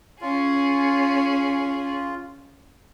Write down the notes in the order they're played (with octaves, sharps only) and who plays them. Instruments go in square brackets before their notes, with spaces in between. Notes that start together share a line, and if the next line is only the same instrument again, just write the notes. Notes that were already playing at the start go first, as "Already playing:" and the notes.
[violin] C#4 G#4 [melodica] F4